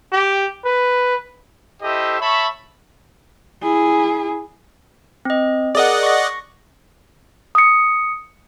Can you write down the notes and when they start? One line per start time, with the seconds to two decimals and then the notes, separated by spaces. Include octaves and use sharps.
0.12 G4
0.65 B4
1.82 E4 G4 A4 C5 D#5 E5
2.20 C#5 E5 A5 B5 C#6
3.63 E4 G#4
5.25 C4 D#5
5.75 G#4 A#4 D5 D#5 F#5
6.03 C#6 A#6
7.55 D#6 C#7